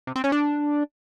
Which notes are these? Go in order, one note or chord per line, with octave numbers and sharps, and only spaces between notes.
C3
C4
C#4
D4